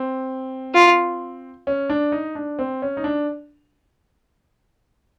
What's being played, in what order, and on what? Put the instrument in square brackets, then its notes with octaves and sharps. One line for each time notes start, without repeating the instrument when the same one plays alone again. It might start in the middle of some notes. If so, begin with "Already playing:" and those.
Already playing: [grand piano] C4
[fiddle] F4
[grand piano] C#4
D4
D#4
D4
C4
C#4
D#4
D4